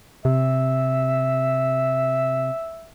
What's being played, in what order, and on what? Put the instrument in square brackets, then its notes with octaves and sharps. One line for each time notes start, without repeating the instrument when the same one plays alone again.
[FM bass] C3 [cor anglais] E5